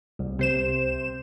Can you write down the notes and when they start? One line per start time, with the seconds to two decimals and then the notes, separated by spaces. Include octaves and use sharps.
0.19 C2
0.39 C3 C5 E7